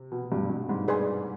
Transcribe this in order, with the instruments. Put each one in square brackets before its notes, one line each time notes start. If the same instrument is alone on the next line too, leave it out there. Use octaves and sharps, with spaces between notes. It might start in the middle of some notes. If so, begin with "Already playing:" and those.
Already playing: [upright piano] C3
B2
G2
G2
G#2
[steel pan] G#4 B4 D5 G#5 C6